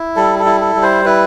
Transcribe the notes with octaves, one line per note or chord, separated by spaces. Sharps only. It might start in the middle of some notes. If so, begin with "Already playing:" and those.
Already playing: E4
G3 A4
A4
E4
A4
G3
C5
E4 B4